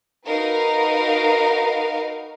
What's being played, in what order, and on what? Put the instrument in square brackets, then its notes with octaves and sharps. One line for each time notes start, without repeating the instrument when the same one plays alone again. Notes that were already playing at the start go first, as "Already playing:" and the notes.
[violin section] D#4 F#4 A#4 B4 F5